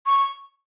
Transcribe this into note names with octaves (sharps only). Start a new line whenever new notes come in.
C#6